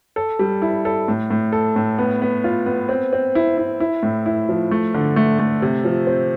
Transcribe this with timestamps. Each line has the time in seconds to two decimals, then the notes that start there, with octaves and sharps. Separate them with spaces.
0.16 A4
0.39 G3
0.62 E4
0.85 A4
1.08 A2
1.30 A2
1.52 A4
1.76 A2
1.98 B3
2.22 B3
2.44 F4
2.66 B3
2.89 C4
3.13 C4
3.35 E4
3.58 E4
3.80 E4
4.03 A2
4.26 E4
4.49 F3
4.71 A3
4.94 D3
5.16 A3
5.39 A3
5.62 C3
5.85 F3
6.07 C4